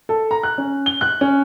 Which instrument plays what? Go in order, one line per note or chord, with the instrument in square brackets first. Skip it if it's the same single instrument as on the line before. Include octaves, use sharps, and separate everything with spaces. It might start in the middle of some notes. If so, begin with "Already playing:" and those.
[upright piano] A4
A#5
F#6
C#4
G7
F#6
C#4